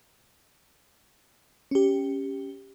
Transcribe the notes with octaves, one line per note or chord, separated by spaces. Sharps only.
C#4 G4